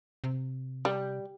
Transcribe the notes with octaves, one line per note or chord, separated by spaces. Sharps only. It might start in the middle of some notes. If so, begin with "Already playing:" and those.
C3
G3